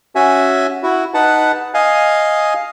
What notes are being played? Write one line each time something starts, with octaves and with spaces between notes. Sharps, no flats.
C#4 F#4 E5 G#5
E4 F#4
D#4 B4 F#5 A5
D#5 F5 G#5